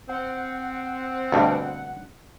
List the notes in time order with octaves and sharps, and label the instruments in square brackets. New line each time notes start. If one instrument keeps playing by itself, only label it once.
[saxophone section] C4 [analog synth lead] F#5
[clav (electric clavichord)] D2 G2 B2